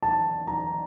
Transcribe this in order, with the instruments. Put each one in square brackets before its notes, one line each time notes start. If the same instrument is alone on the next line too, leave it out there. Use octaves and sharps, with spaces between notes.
[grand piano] A5
A#5